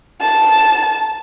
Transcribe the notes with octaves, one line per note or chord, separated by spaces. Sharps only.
A5